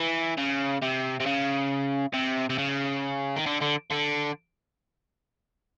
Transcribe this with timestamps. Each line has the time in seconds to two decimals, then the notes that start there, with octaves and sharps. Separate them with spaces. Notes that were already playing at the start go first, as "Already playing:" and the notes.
Already playing: E3
0.37 C#3
0.82 C3
1.20 C3
1.26 C#3
2.14 C3
2.50 C3
2.58 C#3
3.36 D#3
3.46 D3
3.61 D3
3.90 D3